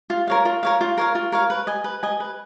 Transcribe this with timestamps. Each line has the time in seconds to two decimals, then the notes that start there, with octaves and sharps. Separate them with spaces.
0.10 F4
0.27 A#4 C#5 F5
0.45 F4
0.63 A#4 C#5 F5
0.81 F4
0.98 A#4 C#5 F5
1.15 F4
1.32 A#4 C#5 F5
1.50 B4
1.67 D#5 G#5
1.84 B4
2.03 D#5 G#5
2.20 B4